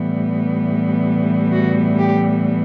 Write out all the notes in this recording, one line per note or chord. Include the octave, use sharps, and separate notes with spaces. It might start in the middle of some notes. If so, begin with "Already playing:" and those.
Already playing: A2 E3 G3 B3
F#4
G4